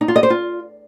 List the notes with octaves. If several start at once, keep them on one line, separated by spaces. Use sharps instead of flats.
D#4
F4
D#5
C5
F4